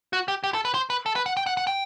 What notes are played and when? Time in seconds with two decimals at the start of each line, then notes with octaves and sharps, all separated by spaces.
0.13 F#4
0.28 G4
0.44 G4
0.54 A4
0.65 B4
0.74 C5
0.90 B4
1.06 A4
1.16 B4
1.26 F#5
1.37 G5
1.46 F#5
1.57 F#5
1.67 G5